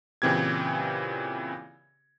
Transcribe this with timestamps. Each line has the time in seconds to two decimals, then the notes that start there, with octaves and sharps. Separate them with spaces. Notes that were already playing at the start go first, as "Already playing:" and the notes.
0.22 A#2 C#3 E3 C4 G4 G#6